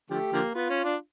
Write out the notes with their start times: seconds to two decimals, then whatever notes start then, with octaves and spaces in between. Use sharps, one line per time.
0.10 D3 F3 A3 G4
0.33 D3 F3 A#3
0.55 B3 F4
0.70 C#4
0.84 D4